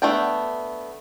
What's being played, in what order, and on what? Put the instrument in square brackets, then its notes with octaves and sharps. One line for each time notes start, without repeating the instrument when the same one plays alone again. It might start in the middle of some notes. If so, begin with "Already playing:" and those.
[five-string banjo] A3 B3 D4 G5